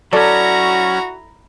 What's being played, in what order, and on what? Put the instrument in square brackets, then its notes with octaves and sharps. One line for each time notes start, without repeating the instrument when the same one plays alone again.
[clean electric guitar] F#3 C#4 [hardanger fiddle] E4 A#5 [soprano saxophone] F#4 [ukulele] A4 D5